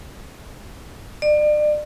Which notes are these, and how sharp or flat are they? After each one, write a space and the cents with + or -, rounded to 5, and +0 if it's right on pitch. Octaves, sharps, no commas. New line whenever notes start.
D5 +35